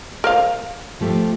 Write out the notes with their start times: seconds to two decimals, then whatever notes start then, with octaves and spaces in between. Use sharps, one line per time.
0.24 A#4 C5 F5
1.01 F3 A3 G4